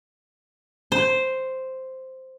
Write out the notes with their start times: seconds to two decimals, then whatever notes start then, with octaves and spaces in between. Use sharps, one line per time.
0.92 C5